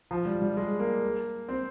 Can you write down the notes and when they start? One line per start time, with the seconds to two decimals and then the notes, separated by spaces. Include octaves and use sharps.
0.11 F3
0.26 G3
0.42 G3
0.57 G#3
0.79 A#3
1.48 C4